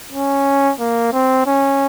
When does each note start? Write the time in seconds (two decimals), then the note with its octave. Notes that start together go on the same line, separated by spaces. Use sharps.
0.13 C#4
0.80 A#3
1.13 C4
1.46 C#4